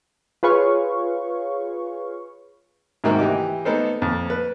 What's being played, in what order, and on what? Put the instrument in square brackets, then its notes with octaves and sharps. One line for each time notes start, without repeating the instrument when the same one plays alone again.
[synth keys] F4 G#4 B4 C#5 F5 C#6
[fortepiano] G#2 C3 D#3 A#3 C4 F#4
E3 G4 D#5 D6
A#3 B3 D#4 A4 A#4 C5
F2 A#2
B4